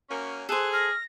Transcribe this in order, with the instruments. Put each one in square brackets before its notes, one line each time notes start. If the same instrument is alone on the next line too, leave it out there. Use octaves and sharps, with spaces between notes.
[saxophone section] F#2 A#3 C#4
[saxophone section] G#4 [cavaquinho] A4 C5 [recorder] F#6
[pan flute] F6 [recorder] A#6